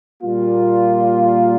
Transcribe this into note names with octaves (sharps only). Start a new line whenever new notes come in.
A#2 G3 A#3 F4